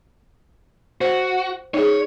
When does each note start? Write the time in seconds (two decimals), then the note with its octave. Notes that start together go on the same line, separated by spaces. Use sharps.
1.01 F#4 C5
1.74 D#4 G#4 C#5